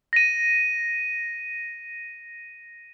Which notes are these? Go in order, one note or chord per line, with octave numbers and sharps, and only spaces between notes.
A#6 D#7